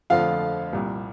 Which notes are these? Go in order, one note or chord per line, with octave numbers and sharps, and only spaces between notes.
F2 D3 F3 A3 F4 F5
C2 A#2 G3